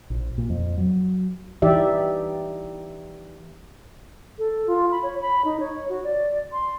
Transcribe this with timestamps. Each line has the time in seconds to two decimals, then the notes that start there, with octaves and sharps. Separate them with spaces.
0.10 A#1
0.38 A#2
0.50 F2
0.77 F#3
1.62 E3 D#4 G4 D5 E5
4.39 A4
4.67 F4
4.91 B5
5.03 C#5
5.22 B5
5.45 D#4
5.60 C#5
5.89 F#4
6.04 D5
6.52 C6